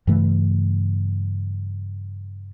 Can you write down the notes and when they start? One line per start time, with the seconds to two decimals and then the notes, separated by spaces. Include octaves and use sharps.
0.07 G2 C#3 E3 A3